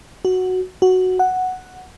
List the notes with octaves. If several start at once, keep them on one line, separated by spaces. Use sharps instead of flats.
F#4
F#4
F#5